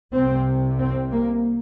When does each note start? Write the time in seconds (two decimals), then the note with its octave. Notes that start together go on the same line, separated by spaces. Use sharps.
0.13 C2 C3 C4
0.79 C4
1.12 A#3